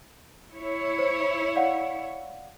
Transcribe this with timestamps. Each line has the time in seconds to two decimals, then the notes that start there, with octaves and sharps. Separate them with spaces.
0.53 E4 C#5
0.99 C5
1.56 D5 F5 F#5